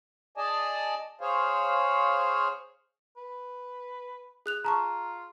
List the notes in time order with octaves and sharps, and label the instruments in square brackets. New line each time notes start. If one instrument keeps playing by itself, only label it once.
[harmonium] G#4 D5 D#5 G#5 A5
G#4 C5 C#5 F5
[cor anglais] B4
[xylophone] G#4 F#6 F7
[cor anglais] F4 [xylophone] G#4 A5 C#6 [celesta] A#5